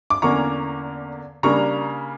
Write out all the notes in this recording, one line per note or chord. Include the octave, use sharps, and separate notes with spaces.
D6
E2 D3 A#3 C#4 A#5 C#6
C#3 G3 A#3 D4 A#5 C#6